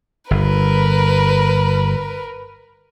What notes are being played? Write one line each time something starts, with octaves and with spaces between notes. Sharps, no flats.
G1 A#4 B4